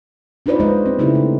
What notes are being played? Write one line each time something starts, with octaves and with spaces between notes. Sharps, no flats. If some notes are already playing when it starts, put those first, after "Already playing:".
D4 D#4 F4 B4 C5 D5
G#3 A#3 C5 D#5
C4
C#3 A3 D#4 E4 G4
D#4